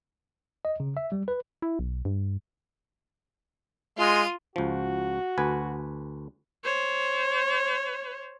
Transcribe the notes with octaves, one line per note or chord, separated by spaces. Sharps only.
D#5
C#3
E5
G3
B4
E4
B1
G2
G#3 F4 D#7
C#2 F3 F#4
D2 B4 G#5
C5 C#5